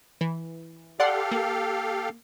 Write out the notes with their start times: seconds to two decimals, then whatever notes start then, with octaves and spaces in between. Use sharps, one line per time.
0.21 E3
1.00 G4 A4 D5 F5 F#5 C6
1.31 A#3